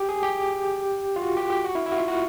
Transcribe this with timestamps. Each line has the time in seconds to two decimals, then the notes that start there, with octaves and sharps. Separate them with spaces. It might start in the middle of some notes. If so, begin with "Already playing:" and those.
Already playing: G4
0.09 G#4
0.23 G4
1.16 F4
1.22 F#4
1.37 G4
1.50 G4
1.65 F#4
1.75 E4
1.86 E4
1.92 F#4
1.97 F4
2.08 F#4